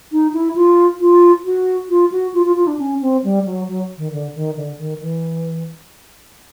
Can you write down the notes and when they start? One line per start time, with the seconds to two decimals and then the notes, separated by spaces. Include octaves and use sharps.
0.12 D#4
0.33 E4
0.56 F4
1.00 F4
1.45 F#4
1.90 F4
2.12 F#4
2.34 F4
2.45 F4
2.56 F4
2.67 D4
2.79 C#4
3.02 C4
3.24 G3
3.46 F#3
3.68 F#3
3.98 D#3
4.12 D3
4.35 D#3
4.57 D3
4.78 D#3
5.01 E3